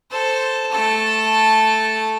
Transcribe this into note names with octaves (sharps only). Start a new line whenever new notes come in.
A4 C5
A3 A4